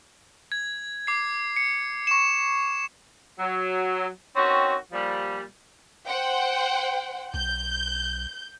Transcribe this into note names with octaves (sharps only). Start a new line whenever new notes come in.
G#6
D6 C7
C#7
C#6 E7
F#3
D#3 C4 C#4 F#4
A#2 F3 G3
C5 F#5 G5
B1 G6